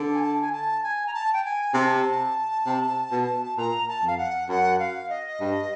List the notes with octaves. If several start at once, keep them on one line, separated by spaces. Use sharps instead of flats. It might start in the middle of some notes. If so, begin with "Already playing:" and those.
Already playing: D3
G#5
A5
G#5
A5
G#5
A#5
A5
G5
G#5
C3 A5
C3
B2
A#2 A#5
A5
F2 F5
F#5
F#2 F#5
F5
D#5
G2